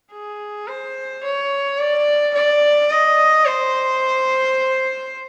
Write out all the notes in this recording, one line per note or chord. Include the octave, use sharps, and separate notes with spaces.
G#4
C5
C#5
D5
D5
D#5
C5